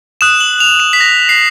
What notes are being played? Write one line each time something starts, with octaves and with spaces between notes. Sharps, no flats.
D#6 F#6 E7
F#7
F7
E7
B6
A#6
C7